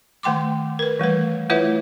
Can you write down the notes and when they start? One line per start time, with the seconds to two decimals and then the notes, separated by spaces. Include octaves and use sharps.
0.23 D#3 A3 G5 C6 D6
0.79 A#4 B4
0.99 E3 G3 A3 B4
1.49 A3 E4 F4 B4 C#5 E5